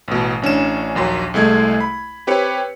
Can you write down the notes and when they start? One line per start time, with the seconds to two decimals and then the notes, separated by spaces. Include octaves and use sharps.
0.08 A1 B2
0.42 A1 C#4 D4 E7
0.95 A#1 D#2 F#3 C6
1.34 C2 G#3 A3 G#6
1.80 B5
2.27 C4 G4 B4 C#5 C#7